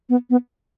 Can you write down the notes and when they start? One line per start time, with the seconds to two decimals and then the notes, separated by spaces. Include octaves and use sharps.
0.09 B3
0.30 B3